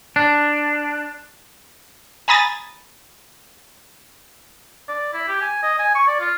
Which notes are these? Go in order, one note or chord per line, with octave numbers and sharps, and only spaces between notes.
D4
G#5 A#5 B5 D#6 G#6 A6
D5
E4
G4
G#5
D#5
G#5
C#6
D5
F4